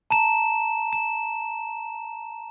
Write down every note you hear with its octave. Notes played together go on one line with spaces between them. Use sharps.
A5 A#5 E7
E7